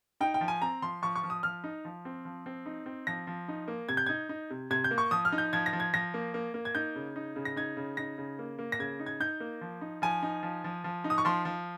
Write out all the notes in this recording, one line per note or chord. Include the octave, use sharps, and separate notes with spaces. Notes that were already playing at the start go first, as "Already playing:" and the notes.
D#4 G5
G5
F3
G#5
C4 A#5
F3 C6
F3 C#6
C#6
F3
D#6
F3 F6
D#4
F3
C4
F3
C4
D#4
C4
F3 A#6
F3
D#4
A#3
C3 G#6
G6
D#4 G#6
D#4
C3
C3 G#6
G6
A#3
C#6
F3 D#6
F6
D#4
G6
F3 G#6
A#6
F3
G#6
F3 A#6
A#3
A#3
A#3
G#6
D#4 G6
C#3
D#4
C#3
A#6
D#4 G#6
C#3
D#4 A#6
C#3
A#3
A#3
A#6
C#3 G#6
D#4
G#6
D#4 G6
A#3
F3
D#4
F3 G#5
D#4
F3
F3
F3
D#4
D#6
C#6
F3 C6
F3